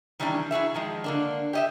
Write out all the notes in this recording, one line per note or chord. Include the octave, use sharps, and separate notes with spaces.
D#3 E3 G3 A#3 C#4 D4
E4 F#4 G#4 E5
D#3 F3 G#3
D3 A#3 D4
G4 D#5 E5